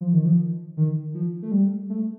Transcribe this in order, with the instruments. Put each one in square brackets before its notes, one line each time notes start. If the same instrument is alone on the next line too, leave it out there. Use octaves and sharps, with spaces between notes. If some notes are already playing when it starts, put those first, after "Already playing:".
[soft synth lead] F3
D#3
F3
D#3
F3
A3
G3
A3